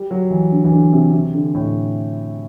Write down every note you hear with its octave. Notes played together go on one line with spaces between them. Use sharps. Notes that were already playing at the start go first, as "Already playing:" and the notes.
Already playing: G3
F#3
E3
D3
E3
D3
C3
C3
D3
A2